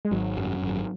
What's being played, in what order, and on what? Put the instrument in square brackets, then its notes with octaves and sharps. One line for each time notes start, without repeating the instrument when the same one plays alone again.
[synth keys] G#3
[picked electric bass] G#1 [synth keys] F#3
[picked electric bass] F#2
G#1